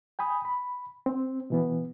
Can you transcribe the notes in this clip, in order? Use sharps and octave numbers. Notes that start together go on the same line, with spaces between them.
G5 G#5 B5 D#6
B5
C4
B2 E3 B3